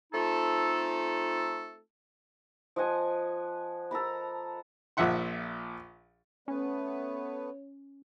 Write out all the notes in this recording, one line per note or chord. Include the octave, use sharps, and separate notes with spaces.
A3 C4 D#4 F4 A4
F3 D#5 F#5 G#5
A4 A#4 A#5 B5
A#1 A#2 F3 E5 F#5 C6
A3 B3 C#4 B4 C#5